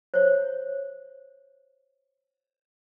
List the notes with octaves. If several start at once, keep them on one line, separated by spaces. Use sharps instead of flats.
C5 C#5